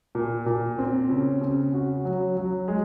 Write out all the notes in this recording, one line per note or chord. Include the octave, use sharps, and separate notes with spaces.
A#2
A#2
C4
C#3
C#3
F#4
F#3
F#3
G#3